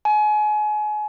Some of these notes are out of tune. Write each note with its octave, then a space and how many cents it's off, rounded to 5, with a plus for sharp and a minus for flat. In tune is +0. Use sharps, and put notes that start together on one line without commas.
G#5 +30